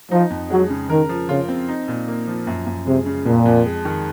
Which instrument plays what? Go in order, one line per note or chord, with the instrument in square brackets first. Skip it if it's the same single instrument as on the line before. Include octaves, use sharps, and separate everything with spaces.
[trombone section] F3 [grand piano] D#4
[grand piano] F2
[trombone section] F#3 [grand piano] G#3
[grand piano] C#3
[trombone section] D#3 [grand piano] A#4
[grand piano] F3
[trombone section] C#3 [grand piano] F4
[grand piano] C4
D#4
A#2
A#3
F3
F#2
F#2
[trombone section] C3 [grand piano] G#3
[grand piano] C#3
[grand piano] F2 [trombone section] A#2
[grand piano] F2
G#3
D#3